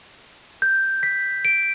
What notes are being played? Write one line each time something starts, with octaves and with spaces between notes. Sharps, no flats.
G6
B6
D7